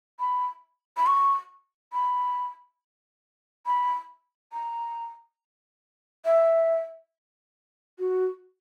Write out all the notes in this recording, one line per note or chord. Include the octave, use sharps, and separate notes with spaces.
B5
B5
C#6
B5
B5
A#5
E5
F#4